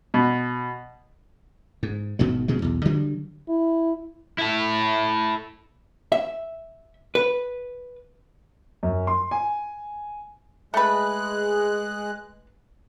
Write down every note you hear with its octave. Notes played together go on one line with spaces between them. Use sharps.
B2
G#2
G#1 B2 D#3 F#3
B2 D#3 G#3
B1 E2
D3 F#3 G3
E4
E4 A4
E5
B4
F#2
C6
G#5
G#3 A3 B4 F#6